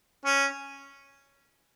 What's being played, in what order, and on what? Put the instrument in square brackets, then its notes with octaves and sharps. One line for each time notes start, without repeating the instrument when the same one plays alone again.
[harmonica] C#4